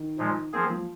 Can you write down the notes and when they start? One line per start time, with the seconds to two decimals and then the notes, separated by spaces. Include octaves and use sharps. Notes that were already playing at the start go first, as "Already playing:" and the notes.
Already playing: D#3
0.18 A#2 F3 G#3
0.53 F3 A#3 C4 G#4
0.70 F3